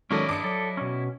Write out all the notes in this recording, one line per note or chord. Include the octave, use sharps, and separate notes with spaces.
D#3 F#3 G#3 C#4 E4 A4 D5 D#5
G2 D4 D6 D#6 C#7
F#3 A4
B2 C#4